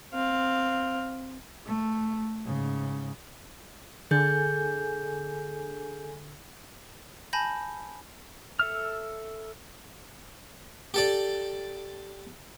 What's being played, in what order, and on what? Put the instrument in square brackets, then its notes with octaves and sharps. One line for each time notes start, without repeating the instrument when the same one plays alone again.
[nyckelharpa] C4 F5
[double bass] A3
G#2 C#3
[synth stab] D3 [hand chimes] G#4 G6 [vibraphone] A4 G#5
[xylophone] G#5 A5 B5 G6 A#6
[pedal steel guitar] A4 E5 F6
[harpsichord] G4 A4 D5